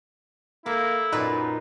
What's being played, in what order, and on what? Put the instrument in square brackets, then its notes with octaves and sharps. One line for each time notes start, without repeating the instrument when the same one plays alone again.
[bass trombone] A#3 [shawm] E4 [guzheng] A4
[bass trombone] F#2 [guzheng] A#2 B4 D5 [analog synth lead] D#4